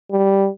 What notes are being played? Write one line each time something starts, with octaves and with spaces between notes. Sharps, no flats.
G3